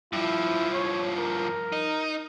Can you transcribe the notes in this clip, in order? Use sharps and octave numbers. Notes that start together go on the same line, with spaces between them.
G2 F3 E4
C#5
A#4
D#4